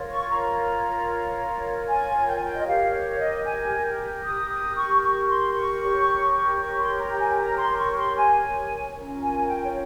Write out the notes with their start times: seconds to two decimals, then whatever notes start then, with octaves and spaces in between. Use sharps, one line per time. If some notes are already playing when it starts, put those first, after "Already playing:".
Already playing: F4 A#4 C#5
0.11 C#6
0.31 A#5
1.88 G#5
2.27 G5
2.36 G#5
2.45 G5
2.56 D#5
2.67 G4 A#4 C#5 F5
2.93 C#5
3.19 D#5
3.45 G#5
4.24 D#6
4.50 D#6
4.76 C#6
5.02 C#6
5.29 C6
5.54 C#6
5.81 G4 A#4 C#5
6.60 C#6
6.79 C6
6.98 A#5
7.11 G5
7.18 G#5
7.38 A#5
7.58 C6
7.77 C#6
7.97 C6
8.17 G#5
8.95 C#4 F4 A#4
9.21 G#5
9.47 G5
9.64 C#5